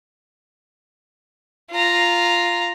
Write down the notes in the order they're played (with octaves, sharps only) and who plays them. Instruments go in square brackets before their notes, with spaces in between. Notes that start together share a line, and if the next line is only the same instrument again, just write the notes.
[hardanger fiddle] F4 A#5